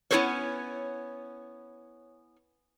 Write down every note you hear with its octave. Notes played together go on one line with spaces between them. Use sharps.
B3 C#4 E4 A4 C5 C#5